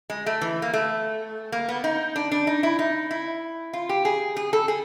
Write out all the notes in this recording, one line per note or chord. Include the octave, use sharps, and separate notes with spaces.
G#3
A3
E3
A#3
A3
A#3
B3
D#4
D4
D4
D#4
E4
D#4
E4
F4
G4
G#4
G#4
A4
G#4